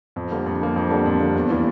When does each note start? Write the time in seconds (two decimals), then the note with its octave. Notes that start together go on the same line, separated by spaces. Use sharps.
0.16 F2
0.31 D3 G3 A#3
0.46 F2
0.61 D3 G3 A#3
0.76 F2
0.91 D3 G3 A#3
1.06 F2
1.20 D3 G3 A#3
1.35 E2
1.50 E3 G3 A#3